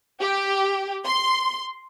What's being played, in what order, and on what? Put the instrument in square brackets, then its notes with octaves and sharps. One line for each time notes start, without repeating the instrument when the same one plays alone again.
[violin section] G4
C6